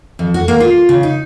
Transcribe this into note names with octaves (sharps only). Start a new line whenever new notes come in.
F2
F#4
A#3
F4
C#3
D#4